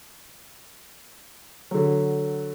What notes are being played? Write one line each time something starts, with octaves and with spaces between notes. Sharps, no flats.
D3 F#3